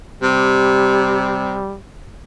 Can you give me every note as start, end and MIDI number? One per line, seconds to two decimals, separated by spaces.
0.22 1.60 48
0.22 1.77 55